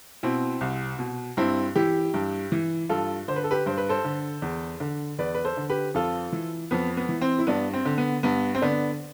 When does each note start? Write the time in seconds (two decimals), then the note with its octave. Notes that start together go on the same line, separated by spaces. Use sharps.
0.23 B2 C4 E4
0.61 C2
0.99 B2
1.37 G2 C4 E4
1.76 E3 E4 G4
2.14 G2
2.52 E3
2.89 G2 F4 A4
3.28 D3 C5
3.36 B4
3.44 A4
3.51 G4 B4
3.66 G2 C5
3.77 B4
3.89 A4 C5
4.05 D3
4.42 E2
4.80 D3
5.18 E2 B4 D5
5.35 B4
5.45 A4 C5
5.57 D3
5.70 G4 B4
5.94 F2 F4 A4
6.32 E3
6.71 F2 B3
6.97 B3
7.09 E3
7.21 C4
7.39 E4
7.47 G2 B3 D4
7.73 C4
7.85 D3
7.98 B3
8.23 G2 B3
8.55 C4
8.62 D3 B3 D4